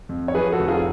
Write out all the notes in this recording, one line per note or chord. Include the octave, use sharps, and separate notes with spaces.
F2
C#5
F3 G#4 B4
F#4 A4
F1
F4 G#4